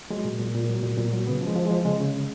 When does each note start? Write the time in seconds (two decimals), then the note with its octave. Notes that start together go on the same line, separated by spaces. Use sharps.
0.11 F#3 G#3
0.25 A#2
0.40 A#2
0.55 A#2
0.69 F#3
0.83 A#2
0.98 A#2
1.13 F#3
1.27 C#3 B3
1.42 F3 G#3
1.56 F3
1.66 F3 G#3
1.85 C#3 G#3
2.00 C#3
2.14 C#3